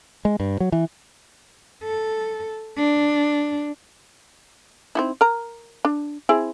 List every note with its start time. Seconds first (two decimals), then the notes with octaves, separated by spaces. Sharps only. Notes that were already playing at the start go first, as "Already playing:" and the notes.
0.25 G#3
0.40 G2
0.60 F#3
0.72 E3
1.84 A4
2.78 D4
4.95 C4 D#4 E4
5.21 A#4 A#5
5.85 D4
6.29 C4 E4 G#4